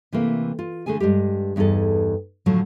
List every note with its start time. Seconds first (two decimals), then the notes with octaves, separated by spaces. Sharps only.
0.13 C3 E3 A3 A#3
0.59 F4
0.86 D3 A3 G#4 A4 G#5
1.00 G2 C3 G#3 G4
1.56 E2 G2 D#4 G#4 A4
2.46 A2 D3 F3 F#3